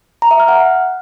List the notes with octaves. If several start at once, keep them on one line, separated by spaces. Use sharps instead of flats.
A#5
E5
F6
F#5